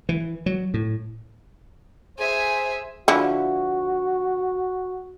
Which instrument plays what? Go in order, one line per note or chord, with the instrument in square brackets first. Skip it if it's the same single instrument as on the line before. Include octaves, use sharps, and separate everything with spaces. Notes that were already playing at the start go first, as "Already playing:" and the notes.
[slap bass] E3
F#3
A2
[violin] G#4 E5 [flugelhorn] C5 [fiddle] G#5
[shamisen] D3 F3 E4 [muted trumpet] F#4